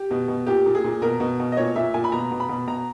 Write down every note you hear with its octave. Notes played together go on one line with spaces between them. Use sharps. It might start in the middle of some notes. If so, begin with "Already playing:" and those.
Already playing: G4
B2
B2
A#2 G4
A#2
G#4
A#2
B2 A#4
B2
B2
D#5
A#2 C#5
A#2 E5
A#2 G#5
B5
B2 A#5
B2
B5
B2
B2 A#5